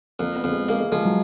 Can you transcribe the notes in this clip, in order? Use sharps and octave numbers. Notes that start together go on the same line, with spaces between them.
F2 A#3
B3
F2
G#3
G#3 A#3
G#3
F3 G#3
F#3